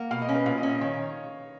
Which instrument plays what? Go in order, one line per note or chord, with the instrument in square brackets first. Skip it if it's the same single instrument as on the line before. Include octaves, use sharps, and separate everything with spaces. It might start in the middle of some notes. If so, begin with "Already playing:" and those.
Already playing: [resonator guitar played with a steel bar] A#3 [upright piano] F#5
[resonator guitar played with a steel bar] B2 [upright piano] F5
[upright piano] D#5
[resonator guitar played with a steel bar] C#4
[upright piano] B4
[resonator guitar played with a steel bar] A#2 [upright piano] F5
[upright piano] D#5
[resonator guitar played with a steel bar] C#4
[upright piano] D#5
[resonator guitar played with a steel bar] D#3 [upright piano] C#5